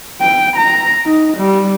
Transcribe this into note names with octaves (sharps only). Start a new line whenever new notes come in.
G5
A#5
D#4
G3